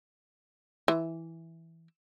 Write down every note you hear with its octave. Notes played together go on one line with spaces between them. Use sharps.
E3